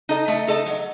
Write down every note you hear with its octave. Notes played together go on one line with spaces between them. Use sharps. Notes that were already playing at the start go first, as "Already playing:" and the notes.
D#4 A4 D#5
A3
D#4 A4 D#5
F#3